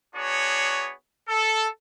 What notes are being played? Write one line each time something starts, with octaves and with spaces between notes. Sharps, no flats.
B3 D4 F#4 G#4 C#5
A4